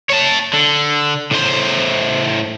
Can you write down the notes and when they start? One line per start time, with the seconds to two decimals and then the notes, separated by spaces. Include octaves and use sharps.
0.10 C#5 A5
0.53 D3
1.31 A2 C5